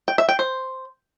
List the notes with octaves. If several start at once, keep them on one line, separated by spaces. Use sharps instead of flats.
G5
E5
G5
C5